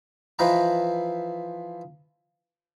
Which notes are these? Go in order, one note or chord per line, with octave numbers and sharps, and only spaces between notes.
E3 F3 B4 D#5 G5 A#5